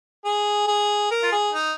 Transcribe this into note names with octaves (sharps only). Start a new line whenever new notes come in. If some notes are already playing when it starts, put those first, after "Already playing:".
G#4
G#4
A#4
F4
G#4
D#4